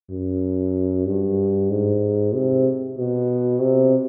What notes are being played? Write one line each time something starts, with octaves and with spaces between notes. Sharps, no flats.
F#2
G2
G#2
C3
B2
C3